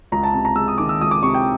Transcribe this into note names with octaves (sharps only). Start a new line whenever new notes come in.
C#2 A#5
A5
C3 A5
A#5
G#3 E6
D#6
D#3 D6
E6
C#2 D#6
D6
C3 C#6
G5